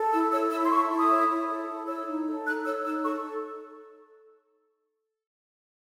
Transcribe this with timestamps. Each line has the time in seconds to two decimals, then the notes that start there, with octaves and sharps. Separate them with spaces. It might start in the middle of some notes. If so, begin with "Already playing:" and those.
Already playing: A4
0.12 E4 E6
0.31 C#5 E6
0.51 E4 E6
0.65 C6
0.70 A4 C#6
0.90 E4
1.00 D#6
1.10 C#5
1.29 E4
1.48 A4
1.68 E4
1.87 C#5 E6
2.07 D#4
2.26 A4
2.45 D#4 F#6
2.65 C#5 E6
2.85 D#4 E6
3.04 A4 C#6